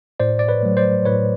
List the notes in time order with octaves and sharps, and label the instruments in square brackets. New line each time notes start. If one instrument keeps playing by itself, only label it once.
[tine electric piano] A2 C5 D5
D5
B4 C#5
F#3 A3
C5 D5
A2 B4 C#5